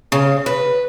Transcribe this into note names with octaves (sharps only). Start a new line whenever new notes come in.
C#3
B4